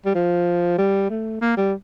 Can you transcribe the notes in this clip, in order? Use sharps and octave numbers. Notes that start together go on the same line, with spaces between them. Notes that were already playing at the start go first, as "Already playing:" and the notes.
G3
F3
G3
A3
A#3
G3